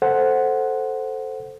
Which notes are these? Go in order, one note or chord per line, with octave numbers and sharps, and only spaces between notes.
A4 C5 F#5